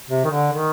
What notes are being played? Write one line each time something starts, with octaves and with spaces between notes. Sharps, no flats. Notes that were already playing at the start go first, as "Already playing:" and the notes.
C3
D#3
D3
D#3